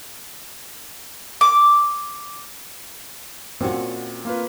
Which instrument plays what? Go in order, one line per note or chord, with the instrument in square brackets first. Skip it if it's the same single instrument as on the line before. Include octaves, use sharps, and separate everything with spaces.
[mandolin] D6
[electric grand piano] A#2 G5 [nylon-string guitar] C4 C#4 F#4
[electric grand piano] A#3 F4 B4